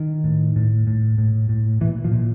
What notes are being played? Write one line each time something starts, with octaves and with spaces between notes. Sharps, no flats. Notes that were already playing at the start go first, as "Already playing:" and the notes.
Already playing: D#3
A2
A2
A2
A2
A2
A#2 E3
F3
A#2